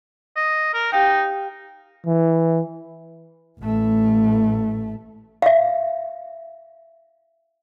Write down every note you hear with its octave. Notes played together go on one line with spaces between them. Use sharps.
D#5
A#4
D#4 G4 F5 G5
E3
A1 A3
E5 F5